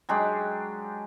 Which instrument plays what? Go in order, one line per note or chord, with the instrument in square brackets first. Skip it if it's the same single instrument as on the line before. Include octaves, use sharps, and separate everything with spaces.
[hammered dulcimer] F#3 G#3 D4 G4